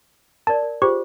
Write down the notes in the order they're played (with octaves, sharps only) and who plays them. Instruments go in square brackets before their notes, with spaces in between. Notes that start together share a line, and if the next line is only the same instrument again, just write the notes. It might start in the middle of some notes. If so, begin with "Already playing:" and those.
[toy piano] A#4 D5 [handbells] A5
[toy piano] A#4
[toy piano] F4 G#4 C5 [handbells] G4 C#6